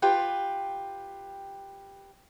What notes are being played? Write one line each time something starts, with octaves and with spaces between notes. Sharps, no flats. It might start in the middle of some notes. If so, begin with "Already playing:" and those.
F4 G4 B4 G5